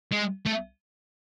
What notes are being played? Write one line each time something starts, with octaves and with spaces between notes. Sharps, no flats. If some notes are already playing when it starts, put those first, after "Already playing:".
G#3
A3